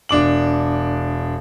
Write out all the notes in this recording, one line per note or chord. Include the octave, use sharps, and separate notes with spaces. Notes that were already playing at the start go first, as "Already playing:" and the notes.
E1 D4 D6 F#7